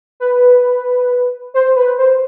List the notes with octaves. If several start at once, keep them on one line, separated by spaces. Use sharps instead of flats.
B4
C5
B4
C5